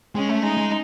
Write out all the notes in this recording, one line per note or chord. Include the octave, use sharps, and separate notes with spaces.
G#3 C#4
A3
G#3 D#4
G#3